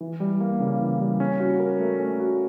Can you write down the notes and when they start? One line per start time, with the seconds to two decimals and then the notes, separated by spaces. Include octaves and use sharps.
0.01 E3
0.20 G3
0.40 A#3
0.60 C#3
0.80 E3
1.00 G3
1.20 C#4
1.40 F#4
1.60 A#4
1.80 A3
2.00 C#4
2.20 F#4